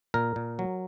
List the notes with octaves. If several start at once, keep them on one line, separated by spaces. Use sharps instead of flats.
A#2 A#4
A#2
F#3